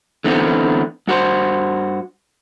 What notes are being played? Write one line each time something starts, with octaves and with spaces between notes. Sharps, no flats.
D3 E3 A3 B3 C4
G2 F#4 G4 C5